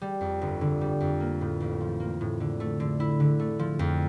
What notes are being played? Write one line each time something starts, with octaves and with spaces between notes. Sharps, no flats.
G3
F2
G1
D3
G3
F2
A#3
A2
A1
F3
A#3
A2
D3
A3
D3
E4
D3
A3
F3
F2